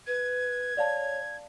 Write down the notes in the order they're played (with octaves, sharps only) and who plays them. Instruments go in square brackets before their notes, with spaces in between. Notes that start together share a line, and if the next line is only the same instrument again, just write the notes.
[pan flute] B4 [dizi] G#6
[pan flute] C#5 [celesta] D5 F5 A5